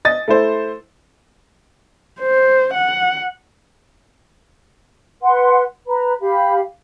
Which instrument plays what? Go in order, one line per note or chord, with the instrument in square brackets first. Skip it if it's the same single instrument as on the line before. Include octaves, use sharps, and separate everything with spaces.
[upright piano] D#5 A6
A3 E4 C5
[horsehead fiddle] C5
F#5
[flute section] B4 F#5 C6
B4 A#5 B5
G4 F5 B5